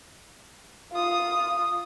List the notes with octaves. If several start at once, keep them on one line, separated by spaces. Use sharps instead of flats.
F4 D#6